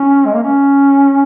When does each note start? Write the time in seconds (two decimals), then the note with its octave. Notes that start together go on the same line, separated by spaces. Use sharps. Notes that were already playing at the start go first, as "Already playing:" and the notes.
Already playing: C#4
0.26 G#3
0.35 A#3
0.44 C#4